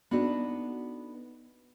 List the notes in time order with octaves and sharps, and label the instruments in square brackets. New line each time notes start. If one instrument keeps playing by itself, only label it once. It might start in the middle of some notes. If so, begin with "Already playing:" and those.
[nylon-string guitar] B3 D4 D#4 F#4 A4 B4